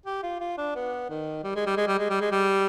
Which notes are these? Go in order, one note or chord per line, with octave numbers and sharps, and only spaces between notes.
G4
F4
F4
D4
B3
D#3
G3
G#3
G3
G#3
G3
G#3
G3
G#3
G3